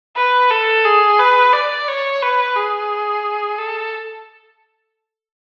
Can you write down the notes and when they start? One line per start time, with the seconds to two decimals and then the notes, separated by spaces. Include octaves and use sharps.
0.16 B4
0.51 A4
0.85 G#4
1.19 B4
1.53 D5
1.88 C#5
2.22 B4
2.56 G#4
3.58 A4